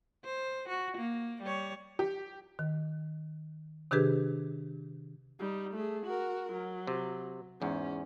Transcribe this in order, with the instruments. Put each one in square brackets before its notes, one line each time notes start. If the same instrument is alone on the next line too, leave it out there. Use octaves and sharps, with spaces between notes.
[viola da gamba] C5
F#4
A#3
G3 C#5
[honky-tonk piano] G4
[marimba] D#3
C3 D#3 D4 G4 G#4 B4
[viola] G3 D#4
A3 G#4
F#4 A#4
F#3
[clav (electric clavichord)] C3
[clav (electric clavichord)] E2 G#2 [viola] C#4